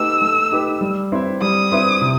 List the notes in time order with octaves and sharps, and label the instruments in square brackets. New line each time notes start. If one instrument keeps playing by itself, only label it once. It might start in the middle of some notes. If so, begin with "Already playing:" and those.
Already playing: [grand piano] A3 D#4 G4 B4 [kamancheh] E6
[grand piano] A3
D#4 G4 B4
G3
C4 E4 B4 E5
[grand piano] G3 [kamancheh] D#6
[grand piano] C4 E4 B4 E5
C3